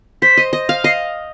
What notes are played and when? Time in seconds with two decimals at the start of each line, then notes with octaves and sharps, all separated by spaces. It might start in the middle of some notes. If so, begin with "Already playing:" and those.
0.22 C5 B6
0.37 D#5
0.53 D#5
0.69 F5
0.84 D#5 C7